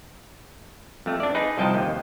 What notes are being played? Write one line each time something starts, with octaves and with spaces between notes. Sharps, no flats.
F2 A3
D4 D5
D#4 G#4 B4
C2 F3 D#5 G5 A5
D#2